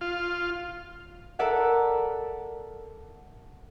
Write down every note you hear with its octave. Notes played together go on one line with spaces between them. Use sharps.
F4
A4 A#4 D5 E5 F#5